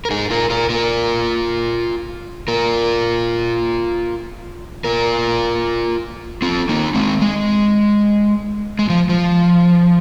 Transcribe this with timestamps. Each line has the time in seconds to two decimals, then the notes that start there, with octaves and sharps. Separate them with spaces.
0.05 A#4
0.11 D#4 G#4
0.30 F4 A#4
0.50 F4 A#4
0.70 F4 A#4
2.48 F4 A#4
4.84 F4 A#4
6.42 C4 F4
6.69 A#3 D#4
6.95 G#3 C4
7.22 G#3
8.79 G#3
8.89 F3
9.09 F3